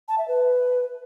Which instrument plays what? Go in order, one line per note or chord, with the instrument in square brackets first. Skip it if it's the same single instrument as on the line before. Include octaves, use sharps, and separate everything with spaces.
[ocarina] A5
E5
B4